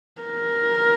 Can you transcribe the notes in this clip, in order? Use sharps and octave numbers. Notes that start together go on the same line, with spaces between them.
A#4